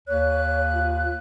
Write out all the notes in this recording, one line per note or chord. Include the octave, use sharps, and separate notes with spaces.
D#2 C#5 F#6
F4